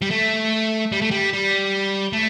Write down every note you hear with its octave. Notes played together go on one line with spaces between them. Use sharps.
G3
A3
G3
A3
G3
G3
A3